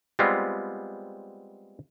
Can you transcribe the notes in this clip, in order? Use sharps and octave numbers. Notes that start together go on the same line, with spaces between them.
G3 G#3 B3 C4 F4